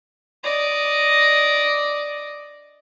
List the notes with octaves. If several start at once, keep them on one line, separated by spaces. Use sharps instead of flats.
D5 D#5